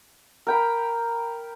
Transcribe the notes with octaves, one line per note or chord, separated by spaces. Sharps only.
A#4 G5 B5